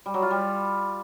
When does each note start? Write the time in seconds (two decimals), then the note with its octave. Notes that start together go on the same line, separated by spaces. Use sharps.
0.06 G3
0.14 F#3
0.22 F4
0.31 G3